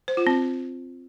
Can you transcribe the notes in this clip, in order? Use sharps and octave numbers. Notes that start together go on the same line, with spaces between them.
C5
F4
C4